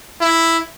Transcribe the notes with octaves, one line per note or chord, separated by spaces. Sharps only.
E4